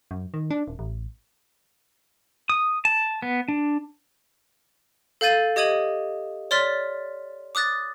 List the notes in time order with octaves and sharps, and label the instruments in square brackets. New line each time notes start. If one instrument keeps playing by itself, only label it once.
[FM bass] F#2
D#3
D4
D#1
A1
[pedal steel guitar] D#6
A5
B3
D4
[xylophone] A4 F5 G6 A6 D#7
G4 D#5 D#6 G#6 D#7 F#7
C#5 D5 C6 F6 A6 B6
D6 D#6 F#6 A6 A#6